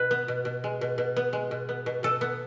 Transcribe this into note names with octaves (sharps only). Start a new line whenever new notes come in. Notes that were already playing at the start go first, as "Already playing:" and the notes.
Already playing: B2 B4
B3
B2
B2
G#3
B2
B2
B3
G#3
B2
B3
B2
B2 A4
B3